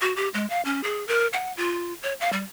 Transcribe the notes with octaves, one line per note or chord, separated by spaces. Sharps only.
F#4
G4
G#3
F5
C#4
G#4
A#4
F#5
F4
C#5
F5
G3